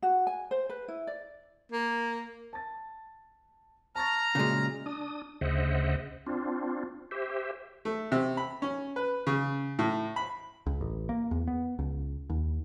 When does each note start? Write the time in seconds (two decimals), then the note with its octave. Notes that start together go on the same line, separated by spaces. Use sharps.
0.03 F#4
0.27 G#5
0.51 C5
0.70 B4
0.88 E4
1.07 D5
1.72 A#3
2.53 A5 A6
3.96 A5 A#5 C#6 F6 A6
4.35 A#2 C#3 F#3 G#3
4.86 D4 D#6
5.41 D2 C#3 C5 D#5 E5 F#5
6.27 C4 D4 F4
7.11 G4 C5 E5
7.85 A3
8.12 C3
8.37 B5
8.62 C#4
8.96 B4
9.27 C#3
9.79 A2
10.16 B5
10.66 C#2
10.81 A1
11.09 A#3
11.31 E2
11.48 B3
11.79 C#2
12.30 D#2